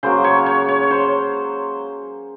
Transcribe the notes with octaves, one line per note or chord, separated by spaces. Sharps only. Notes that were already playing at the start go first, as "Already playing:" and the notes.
C#3 F#3 A#3 C5
C#5
C#5
C#5
C#5
C5